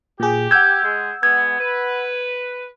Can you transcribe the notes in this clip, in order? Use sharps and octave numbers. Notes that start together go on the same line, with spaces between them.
A#2 G4 G#4
F#5 E6 G6 G#6
G#3
G#3 B3 G#6
B4